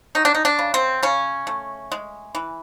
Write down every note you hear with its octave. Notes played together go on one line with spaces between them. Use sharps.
F#3 D#4
D4
D#4
D4
C#3
C4
C#3 C#4
A3
G#3
E3